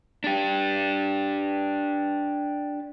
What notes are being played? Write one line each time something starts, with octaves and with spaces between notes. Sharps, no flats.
D4 G4